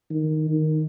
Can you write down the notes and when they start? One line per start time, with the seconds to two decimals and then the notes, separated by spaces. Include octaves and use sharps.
0.10 D#3
0.49 D#3